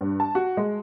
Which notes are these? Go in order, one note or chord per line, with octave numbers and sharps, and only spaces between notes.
G2
A5
F#4
G#3